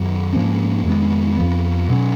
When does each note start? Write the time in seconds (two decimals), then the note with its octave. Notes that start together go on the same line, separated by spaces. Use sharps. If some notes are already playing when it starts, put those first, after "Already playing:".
Already playing: F#2 D#3 F#3
0.33 G#2 F3 A#3 C#4
0.84 F2 D#3 G#3 B3
1.36 F2 F3 B3
1.89 B2 F#3 C#4